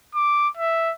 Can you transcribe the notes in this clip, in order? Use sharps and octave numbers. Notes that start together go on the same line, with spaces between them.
D6
E5